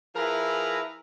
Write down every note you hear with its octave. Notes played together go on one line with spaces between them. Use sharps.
F3 E4 G#4 A#4 B4 A#5